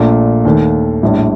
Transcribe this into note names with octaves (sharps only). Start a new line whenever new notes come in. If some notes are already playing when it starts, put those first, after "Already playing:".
Already playing: A#1 A#2 A3
D#2 D#3 A3
A#1 A2 G3